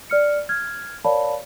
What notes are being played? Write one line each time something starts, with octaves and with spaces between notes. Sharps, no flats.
D5 F6 C#7
F6 G#6
A#4 C#5 D5 F5 A5 B5